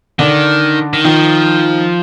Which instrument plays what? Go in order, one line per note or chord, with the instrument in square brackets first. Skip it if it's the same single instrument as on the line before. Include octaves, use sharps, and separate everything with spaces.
[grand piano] D3 D4 [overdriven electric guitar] D#3
[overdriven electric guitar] D#3
[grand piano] D#3 D#4 [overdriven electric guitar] F3